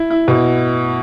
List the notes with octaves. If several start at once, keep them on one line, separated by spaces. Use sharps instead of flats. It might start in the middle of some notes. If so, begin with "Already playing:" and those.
Already playing: E4
E4
B2